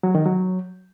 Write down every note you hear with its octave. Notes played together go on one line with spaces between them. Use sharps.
F#3
D#3
F#3